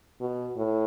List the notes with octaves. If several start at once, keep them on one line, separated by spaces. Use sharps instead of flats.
B2
A2